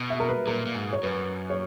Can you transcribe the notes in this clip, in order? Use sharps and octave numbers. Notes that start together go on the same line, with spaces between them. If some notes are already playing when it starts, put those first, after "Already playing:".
Already playing: B2
E5
A#4
B4
A#2 A#4
A#2
G#2
C#5
F#2 B4
C#5